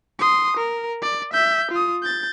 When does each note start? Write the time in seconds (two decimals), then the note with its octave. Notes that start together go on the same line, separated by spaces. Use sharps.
0.19 C6 D#6
0.57 A#4
1.02 D5
1.33 E5 G6
1.71 F4 D#6
2.03 G6 A6